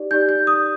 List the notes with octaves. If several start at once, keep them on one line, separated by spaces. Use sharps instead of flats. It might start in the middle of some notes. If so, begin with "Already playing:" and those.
Already playing: D#4 G4 D5
D#4 G4 D5 G6
G6
D#6